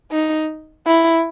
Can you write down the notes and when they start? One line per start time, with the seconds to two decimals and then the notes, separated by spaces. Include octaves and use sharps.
0.11 D#4
0.87 E4